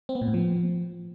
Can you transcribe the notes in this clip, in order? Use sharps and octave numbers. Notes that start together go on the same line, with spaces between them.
C4
B3
A#2
A2
F3